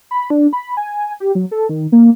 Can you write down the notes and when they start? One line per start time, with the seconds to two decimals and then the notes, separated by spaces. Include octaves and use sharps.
0.11 B5
0.30 D4
0.53 B5
0.77 G#5
1.20 G4
1.35 F#3
1.51 A4
1.69 D#3
1.92 A#3